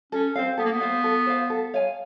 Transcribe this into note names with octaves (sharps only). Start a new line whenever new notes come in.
C#4 A4
C4 C5 F5
B3 A4
A#3
B3
C5 F5
A4
C5 F5
A4
C#5 F5 G#5